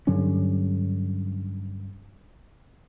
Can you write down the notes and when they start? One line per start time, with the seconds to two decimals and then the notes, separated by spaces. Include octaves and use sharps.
0.07 G2 D3 F#3 C#4